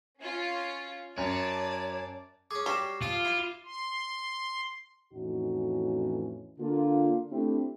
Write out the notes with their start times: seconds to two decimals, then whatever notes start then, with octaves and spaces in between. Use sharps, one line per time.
0.20 C#4 F4
1.18 F#2 C#5 D5 A5
2.51 C#4 G#4 D6
2.66 G3 F#4 G4 C#5 C7 E7
3.02 F3 F4 F5 D#6
3.25 E4 C7 D#7
3.65 C6
5.14 F2 A2 E3 C#4 D#4 F#4
6.60 D3 A#3 D4 F4
7.32 A3 C4 D4 E4 G4